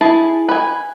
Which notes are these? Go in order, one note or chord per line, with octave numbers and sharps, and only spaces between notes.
E4 G#4 A5
B4 G#5